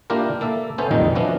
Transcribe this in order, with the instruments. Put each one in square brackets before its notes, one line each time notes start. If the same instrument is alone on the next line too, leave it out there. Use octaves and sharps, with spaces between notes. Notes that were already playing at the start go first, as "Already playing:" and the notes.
[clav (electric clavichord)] A#3 D4 E4 F4 G4 A#4
A#3 A4 E5
B3 C#4 A4 C5 E5 G#5
B1 F2 A#2 D#3 G3 D#4
F3 B3 C#4 D4 E4 F#4